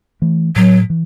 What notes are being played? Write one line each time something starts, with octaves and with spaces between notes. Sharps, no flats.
E3 A3
A2 F#3
E3